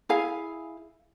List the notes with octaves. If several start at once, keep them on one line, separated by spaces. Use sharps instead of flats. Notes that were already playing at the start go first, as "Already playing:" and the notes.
E4 G#4 F5 G#5